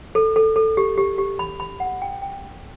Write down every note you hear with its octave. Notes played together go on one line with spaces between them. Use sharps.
A4
A4
A4
G4
G4
G4
B5
B5
F#5
G5
G5